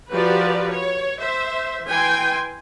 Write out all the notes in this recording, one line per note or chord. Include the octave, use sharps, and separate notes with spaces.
F3 F#4 G4 A#4 B4 D5
C#5
C5 E5
E3 G5 G#5 C6